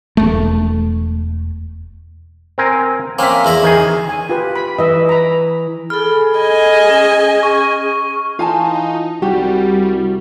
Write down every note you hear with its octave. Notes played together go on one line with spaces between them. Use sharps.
E1 A3
C4 A#4 G#5
A#3 C4 C#4 E5
E2 E4 A#5
D#3 G#4
G#5
F4 G4 B4
B5
E3 D#5 E5
A#5 B5
G#4 A4 B5 F6
D#5 G#5
C#4
C#6
E3 D#4 F4 F5 G#5 A5
C2 G3 F#4 G4